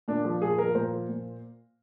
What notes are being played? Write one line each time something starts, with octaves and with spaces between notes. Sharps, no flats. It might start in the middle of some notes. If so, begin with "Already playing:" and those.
A#2 D4
F3
A#2 G#4
F3 A#4
A#2 C5
F3
A#2